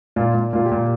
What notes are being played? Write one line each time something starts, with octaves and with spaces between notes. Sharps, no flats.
A#2 F4
A#2
A#2 F4
G4
A#2